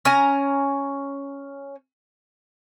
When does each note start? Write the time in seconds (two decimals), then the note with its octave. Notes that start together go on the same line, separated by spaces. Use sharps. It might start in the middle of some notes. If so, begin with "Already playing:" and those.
0.05 C#4 G#5 A#5